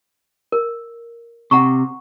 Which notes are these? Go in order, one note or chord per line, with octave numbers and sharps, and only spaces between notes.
A#4
C3 F#5 A#5 C#6